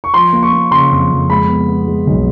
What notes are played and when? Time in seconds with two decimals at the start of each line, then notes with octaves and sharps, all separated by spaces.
0.04 C#6
0.14 F3 C6
0.33 A#3
0.43 C#6
0.52 A#3
0.71 C#3 C6
0.91 F2
1.10 F2
1.30 G#3 B5
1.48 B3
1.68 B3
1.87 G#3
2.07 B1